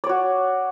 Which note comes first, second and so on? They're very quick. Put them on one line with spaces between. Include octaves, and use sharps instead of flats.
D5 C#5 F#4